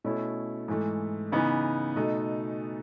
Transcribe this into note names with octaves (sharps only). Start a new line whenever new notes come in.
B2 A3 C#4 E4
G#2 E3 A3
C#3 E3 B3 D#4
B2 A3 D#4